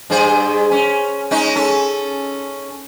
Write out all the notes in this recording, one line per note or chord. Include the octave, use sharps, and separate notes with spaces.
G2 G#4 C5
C#4
G#3 C#4 D#4
C#4 A4